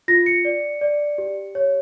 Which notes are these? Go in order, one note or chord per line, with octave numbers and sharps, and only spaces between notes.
F4 A#6
C#7
D5
D5
G4
C#5